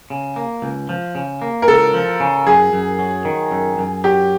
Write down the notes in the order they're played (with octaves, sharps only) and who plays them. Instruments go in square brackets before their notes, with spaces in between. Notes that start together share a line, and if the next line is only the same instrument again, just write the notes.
[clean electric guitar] C#3
A#3
C#2
F3
C#3
A#3
[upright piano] A#4
[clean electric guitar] C#2 [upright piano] A4
[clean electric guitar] F3
C#3
[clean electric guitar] F#2 [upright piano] G#4
[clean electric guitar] F#2
F#3
D#3
F#2
F#2
[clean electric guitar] F#3 [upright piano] G4